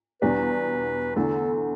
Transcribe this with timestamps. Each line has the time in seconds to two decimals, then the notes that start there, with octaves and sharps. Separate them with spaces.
0.21 E2 B2 G3 D4 B4
1.16 E2 D3 A3 E4 A4